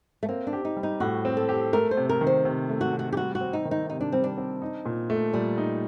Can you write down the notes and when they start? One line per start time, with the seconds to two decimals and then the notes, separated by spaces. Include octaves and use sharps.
0.23 A3
0.29 A#3 C4
0.47 D4
0.53 G4
0.65 D#4
0.77 G3
0.83 D#4
1.00 A2 F#4
1.25 C4
1.37 A4
1.49 G4
1.73 A3 A#4
1.91 C5
1.97 C3
2.09 A#4
2.21 D#3
2.27 C5
2.45 C3
2.69 A3
2.81 F#4
2.93 C3
2.99 F#4
3.12 G4
3.17 G3 F#4
3.35 F#4
3.41 C4
3.53 D#4
3.65 D#3
3.71 D#4
3.89 C3 D#4
4.01 D4
4.12 G3 C4
4.24 D4
4.37 C4
4.62 D#4
4.85 A#2
5.10 A3
5.34 A#2 G3
5.58 D#4